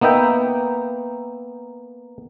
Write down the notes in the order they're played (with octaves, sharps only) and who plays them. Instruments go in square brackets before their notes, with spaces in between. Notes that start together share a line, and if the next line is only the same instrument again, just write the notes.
[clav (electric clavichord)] A#3 B3 D#4 E5 G5